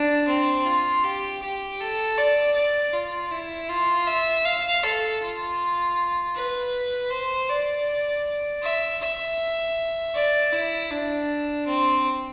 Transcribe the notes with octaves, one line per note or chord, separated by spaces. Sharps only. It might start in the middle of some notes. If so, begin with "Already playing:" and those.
Already playing: D4
C4
F4
G4
G4
A4
D5
D5
F4
E4
F4
E5
F5
A4
F4
B4
C5
D5
E5
E5
D5
E4
D4
C4